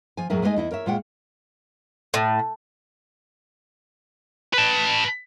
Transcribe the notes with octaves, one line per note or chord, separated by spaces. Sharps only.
F3 G#5
F2 A2 F#3 G#4 A#4 E5
G#3 A3 D#4 C#5 D#5 G#5
E2 E4 D#5
A#4 C#5 E5
A#2 G#3 F4 C#5 F#5 G5
A2
B4 A5